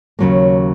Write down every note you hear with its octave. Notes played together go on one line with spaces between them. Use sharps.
D#2 C#3 F#3 A#3